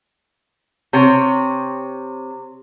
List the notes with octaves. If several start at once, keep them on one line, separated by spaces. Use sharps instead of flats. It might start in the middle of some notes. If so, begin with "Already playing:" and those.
C3 C#5